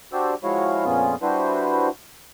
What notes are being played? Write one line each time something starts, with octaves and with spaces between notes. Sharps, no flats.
D4 F#4 G4 C5 D5 E6
F3 G#3 E4 F#4 C#5 F5
F2 A#2 B3 C#4 F4 G#4
G3 D4 E4 F#4 B4 C5